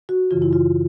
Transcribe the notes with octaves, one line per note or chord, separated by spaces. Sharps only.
F#4
F#2 C#3 E3 F4
E4
F4